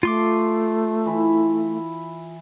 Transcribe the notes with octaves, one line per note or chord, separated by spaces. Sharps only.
A3 F4 C6 D6
E3 E4